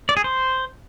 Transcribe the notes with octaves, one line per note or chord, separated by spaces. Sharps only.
D5
G#4
C5